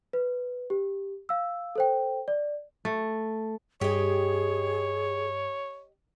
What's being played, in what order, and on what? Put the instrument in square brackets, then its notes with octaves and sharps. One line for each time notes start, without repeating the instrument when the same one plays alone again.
[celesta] B4
G4
F5 E6
A4 C5 G5
D5
[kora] A3
[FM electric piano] G2 [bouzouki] G4 D#5 [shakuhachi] G#4 [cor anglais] C#5